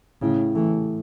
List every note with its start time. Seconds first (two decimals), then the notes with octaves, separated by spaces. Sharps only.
0.22 A2 C#3
0.54 E3 A3